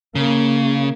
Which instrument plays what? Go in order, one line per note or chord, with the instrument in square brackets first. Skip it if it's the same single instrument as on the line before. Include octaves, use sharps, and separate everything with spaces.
[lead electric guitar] C#3 [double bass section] A#3